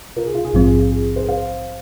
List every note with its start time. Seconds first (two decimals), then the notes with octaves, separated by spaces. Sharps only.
0.16 F4 A#4
0.25 G#4
0.35 F4
0.45 G#4
0.53 A#1 G#2 F3 C4 F4
0.66 G#4
0.79 F4
0.91 G#4
1.16 G#4 C5
1.28 C5 F5